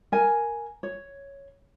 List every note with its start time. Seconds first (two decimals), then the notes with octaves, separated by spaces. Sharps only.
0.12 A#4 G#5
0.83 C#5